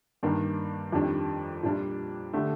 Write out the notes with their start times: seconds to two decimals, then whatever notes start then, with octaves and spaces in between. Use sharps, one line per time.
0.23 G2 D#3 A#3 D4
0.92 F2 D#3 G3 D4 G4
1.63 A#2 G3 D4 F4
2.33 D3 A3 D4 G4